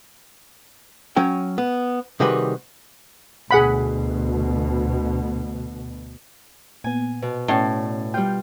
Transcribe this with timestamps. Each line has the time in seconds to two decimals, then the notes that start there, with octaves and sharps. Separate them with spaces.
1.16 F#3 C#4 C#5 G5
1.58 B3
2.20 C3 D#3 G3 F#4 G#4 B4
3.51 D2 B2 G#4 F#5 B5
6.84 A#2 B3 G#5
7.22 B2
7.48 A2 C#4 D5
8.14 G3 F4 G5